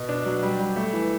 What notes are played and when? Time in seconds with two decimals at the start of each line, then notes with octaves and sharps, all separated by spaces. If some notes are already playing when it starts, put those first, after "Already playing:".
Already playing: B2
0.09 D4
0.26 F#3
0.43 G3
0.60 G3
0.76 A3
0.93 E3